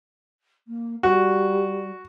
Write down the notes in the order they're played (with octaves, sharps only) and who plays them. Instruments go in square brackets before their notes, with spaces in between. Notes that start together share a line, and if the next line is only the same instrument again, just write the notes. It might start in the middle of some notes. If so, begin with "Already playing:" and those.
[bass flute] A#3
[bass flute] G3 [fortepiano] F#4